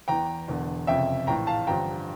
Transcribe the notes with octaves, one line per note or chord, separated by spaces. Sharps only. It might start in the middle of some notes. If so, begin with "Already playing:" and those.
E2 E3 G5 A#5
E1 E2 D3
F1 F2 C#3 E5 G5
A#1 A2 E3 G5 A#5
F5 A5
A1 G2 D3 F3 G5 A#5